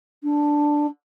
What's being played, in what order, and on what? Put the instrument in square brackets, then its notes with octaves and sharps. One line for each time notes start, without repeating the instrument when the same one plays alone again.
[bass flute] D4